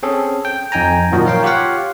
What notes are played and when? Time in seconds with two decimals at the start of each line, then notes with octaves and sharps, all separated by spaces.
0.03 C4 C#4 G#4 A4
0.45 G5
0.72 F2 D#4 G5 G#5 A#5
1.12 F#2 A#2 D#3 F3 F#4
1.25 A#4 C#5 F5 G5
1.43 F4 G4 C#5 F5 F#5